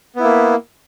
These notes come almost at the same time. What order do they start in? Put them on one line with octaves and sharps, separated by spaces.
B3 E4 A#3